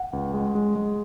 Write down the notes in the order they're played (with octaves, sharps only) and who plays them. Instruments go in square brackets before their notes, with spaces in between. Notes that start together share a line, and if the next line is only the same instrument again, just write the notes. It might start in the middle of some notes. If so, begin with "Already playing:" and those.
Already playing: [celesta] F#5
[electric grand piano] C#2
G#3
G#3
G#3